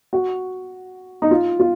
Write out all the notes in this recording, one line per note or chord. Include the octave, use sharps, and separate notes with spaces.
F#4
D#4
F4
F4